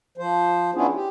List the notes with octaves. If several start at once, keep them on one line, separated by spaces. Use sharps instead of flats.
F3 C5
B3 C#4 D4 E4 F4 G#4
G4